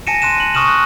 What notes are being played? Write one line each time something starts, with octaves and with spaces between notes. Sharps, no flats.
G#5 A5 A#6 C#7 D#7 E7
C6 F#6 D#7 E7
F#7
C#6 D#6 F6 E7 F#7
F#6